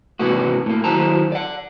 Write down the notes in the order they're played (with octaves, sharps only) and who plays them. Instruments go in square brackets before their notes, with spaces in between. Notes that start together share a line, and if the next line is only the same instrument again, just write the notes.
[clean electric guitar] G#2 C3 E3 A#3 B3 F#4
A2 A#3
D#3 F#3 E4 C5 A5 A#5
D5 F#5